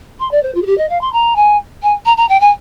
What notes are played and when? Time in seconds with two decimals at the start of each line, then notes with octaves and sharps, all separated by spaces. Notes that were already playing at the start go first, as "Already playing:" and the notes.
0.19 C6
0.31 D5
0.43 C5
0.54 F4
0.62 G#4
0.66 G4
0.77 D#5
0.89 F5
1.01 C6
1.13 A#5
1.36 G#5
1.82 G#5
2.05 A#5
2.17 A#5
2.29 G5
2.40 G#5